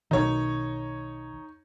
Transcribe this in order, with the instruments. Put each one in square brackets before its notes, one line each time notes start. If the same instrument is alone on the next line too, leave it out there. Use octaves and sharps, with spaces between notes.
[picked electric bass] B1 B2 D#3 [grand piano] D#4 C#5